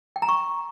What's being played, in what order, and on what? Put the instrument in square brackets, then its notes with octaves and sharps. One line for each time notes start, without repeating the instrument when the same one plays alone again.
[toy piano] G5
A#5
C#6